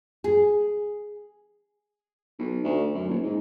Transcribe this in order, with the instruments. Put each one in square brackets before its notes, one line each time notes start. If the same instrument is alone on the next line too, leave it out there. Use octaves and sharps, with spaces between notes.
[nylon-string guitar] G#4
[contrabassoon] B1
D2
F#2
D#1
G#2